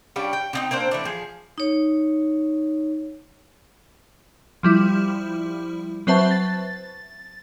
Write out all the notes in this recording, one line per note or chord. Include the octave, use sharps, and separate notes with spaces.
G3 C#4 D4 F4
G5
D3 C4 D#4
A#3 C4 D4 C5
E3 A3 D4
F3 G#4
D#4 C#5
F3 G3 E4
F#3 C4 B4 C5 E5 A5
A6